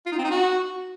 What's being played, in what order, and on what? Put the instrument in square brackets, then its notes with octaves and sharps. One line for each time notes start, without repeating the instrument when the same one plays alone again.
[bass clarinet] F4
D#4
C4
D#4
F#4